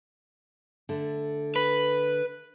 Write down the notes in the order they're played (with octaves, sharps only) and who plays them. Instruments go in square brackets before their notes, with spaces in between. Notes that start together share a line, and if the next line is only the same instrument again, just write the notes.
[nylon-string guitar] D3 A3
[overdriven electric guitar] B4